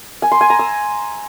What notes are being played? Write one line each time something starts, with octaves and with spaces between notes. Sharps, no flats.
G#5
C6
G#5
A#5
E6